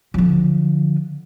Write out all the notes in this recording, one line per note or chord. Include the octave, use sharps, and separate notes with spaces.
D3 F3